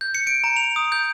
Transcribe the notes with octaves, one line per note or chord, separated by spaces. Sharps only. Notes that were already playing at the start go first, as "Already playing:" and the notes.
G6
C#7
D7
A#5
F7
D#6
G6